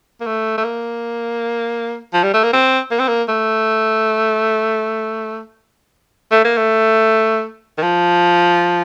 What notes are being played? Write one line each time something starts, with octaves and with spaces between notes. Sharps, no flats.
A#3
A3
A3
A#3
F3
G3
A3
A#3
C4
A#3
C4
A#3
A3
A3
A#3
A3
D#3
F3